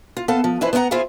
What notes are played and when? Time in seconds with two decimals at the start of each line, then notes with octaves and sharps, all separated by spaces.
0.17 F4
0.28 B3 A4 F5 A5
0.44 F3
0.61 F2 E3 E4 B4 C5
0.73 B3 C#4 F4 F#5 A#5
0.91 E4 F4 G#4 C5 E5 F5